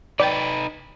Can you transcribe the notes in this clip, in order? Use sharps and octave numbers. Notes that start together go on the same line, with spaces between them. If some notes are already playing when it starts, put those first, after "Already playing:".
D#4 B4 D5 G5 A6